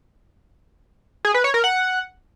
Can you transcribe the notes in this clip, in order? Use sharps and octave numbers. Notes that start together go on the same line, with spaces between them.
G#4
B4
C#5
A#4
F#5